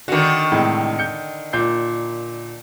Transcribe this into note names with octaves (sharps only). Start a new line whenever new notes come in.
D3 D#3 D4 F#4
A2 C3 G#3
G6 C#7
A#2 G6 C7